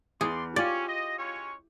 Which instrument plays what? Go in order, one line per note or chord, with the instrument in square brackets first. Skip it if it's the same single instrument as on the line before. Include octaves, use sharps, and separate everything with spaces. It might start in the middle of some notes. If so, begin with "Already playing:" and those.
[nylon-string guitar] E2 [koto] G#4 [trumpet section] D5 C6
[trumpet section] C#4 [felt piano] F4 [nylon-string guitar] G4 [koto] D5
[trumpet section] D#5
G#3 C#4 C#5